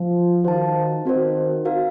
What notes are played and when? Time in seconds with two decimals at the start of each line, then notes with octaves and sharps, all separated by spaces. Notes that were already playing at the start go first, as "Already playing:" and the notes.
Already playing: F3
0.44 D#3 F#4 C5 F5 A5
1.05 D#3 C4 F#4 C5
1.65 F#4 A#4 F5